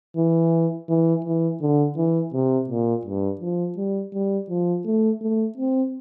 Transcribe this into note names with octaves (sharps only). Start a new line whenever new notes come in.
E3
E3
E3
D3
E3
C3
A#2
G2
F3
G3
G3
F3
A3
A3
C4